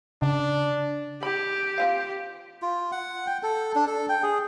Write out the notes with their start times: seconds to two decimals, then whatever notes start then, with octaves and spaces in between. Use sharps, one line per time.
0.22 C#3 D4
1.23 G4 B5
1.78 C4 F4 F5
2.62 F4
2.92 F#5
3.27 G5
3.43 A4
3.75 D4
3.87 A4
4.09 G5
4.23 G#4